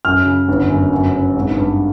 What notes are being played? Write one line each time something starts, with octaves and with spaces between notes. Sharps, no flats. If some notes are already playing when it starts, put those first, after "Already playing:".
F#2 F6
C#3
G1
F#2
F#2
C#3
G#1
G2